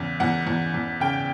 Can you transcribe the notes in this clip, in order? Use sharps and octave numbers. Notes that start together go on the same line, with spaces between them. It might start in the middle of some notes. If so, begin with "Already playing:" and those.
Already playing: E2 C#3 E3
E2 F#5
E2
E2
C#3 G5